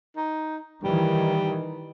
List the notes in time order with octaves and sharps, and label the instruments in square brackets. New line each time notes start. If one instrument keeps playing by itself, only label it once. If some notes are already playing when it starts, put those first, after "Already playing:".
[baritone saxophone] D#4
[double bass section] D#3 E3 [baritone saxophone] G3